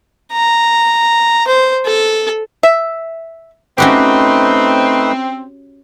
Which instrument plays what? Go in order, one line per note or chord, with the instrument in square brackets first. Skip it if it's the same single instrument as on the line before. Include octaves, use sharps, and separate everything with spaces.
[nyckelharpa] A#5
C5
A4
[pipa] E5
[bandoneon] A3 D#4 B4 [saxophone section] C4 [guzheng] C#4 F#4 G4